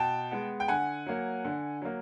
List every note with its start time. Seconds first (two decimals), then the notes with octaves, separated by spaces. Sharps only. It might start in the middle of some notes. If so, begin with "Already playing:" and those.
Already playing: B2 G5 A5
0.31 G#3 B3
0.60 G5
0.68 D3 F#5 G#5
1.06 F#3 A#3
1.45 D3
1.82 F#3 A#3